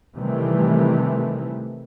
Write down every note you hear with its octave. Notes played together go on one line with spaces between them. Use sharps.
C3 D#3 E3 G3 A3